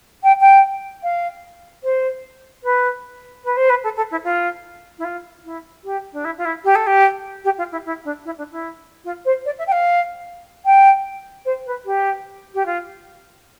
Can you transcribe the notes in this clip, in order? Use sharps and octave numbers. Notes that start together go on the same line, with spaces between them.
G5
G5
F5
C5
B4
B4
C5
B4
A4
A4
E4
F4
E4
F4
E4
G4
D4
E4
F4
E4
G4
A4
G4
G4
F4
E4
E4
D4
E4
D4
E4
F4
C5
D5
E5
G5
F5
G5
C5
B4
G4
G4
F4